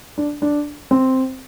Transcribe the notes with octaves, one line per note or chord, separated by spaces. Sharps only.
D4
D4
C4